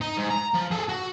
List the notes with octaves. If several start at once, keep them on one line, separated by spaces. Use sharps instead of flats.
D#4
G#2
A#5
F3
G#4 A4
F#4